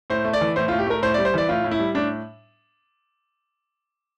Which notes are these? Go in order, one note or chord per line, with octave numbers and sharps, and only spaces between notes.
A2 C5
A3
D5
E3
A2 C5
F4
A2
G4
A3 A#4
A2 C5
D5
G3
C5
E3 D5
A2 F4
A2
E4
G3
A2 D4